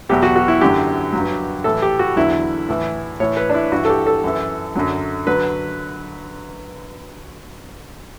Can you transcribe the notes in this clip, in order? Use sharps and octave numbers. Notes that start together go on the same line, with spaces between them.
E2 B2 F#3 G4
F#4
F#4
E4
F#2 D3 F#3 G4
F#3
G2
A2 E3 A4
G4
F#4
E2 D3 F#3 E4
A2 E3
A2 E3 C#5
B4
D4
E4
G2 E3 F#4
A4
G4
A4
F#2 E3
F#2 D3 F#3
D3 F#3 B4